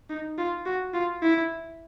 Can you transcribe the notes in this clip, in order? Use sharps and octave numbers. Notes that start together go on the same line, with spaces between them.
D#4
F4
F#4
F4
E4